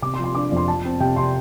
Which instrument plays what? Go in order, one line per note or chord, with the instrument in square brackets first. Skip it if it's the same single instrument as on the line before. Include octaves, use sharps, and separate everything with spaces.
[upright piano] C3 D6
C6
F3
C6
D4 D6
F2 C6
F3 A5
C4
C3 G5
C3 C6